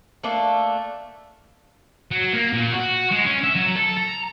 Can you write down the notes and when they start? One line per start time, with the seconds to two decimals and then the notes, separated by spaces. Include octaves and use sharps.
0.23 A3 A#3 D4
2.11 F#3
2.33 A#3
2.53 A#2
2.72 F#4
3.12 G#3
3.26 C#4
3.44 E5
3.56 F#3
3.76 A4
3.97 A#5